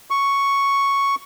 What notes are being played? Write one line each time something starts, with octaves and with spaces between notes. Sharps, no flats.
C#6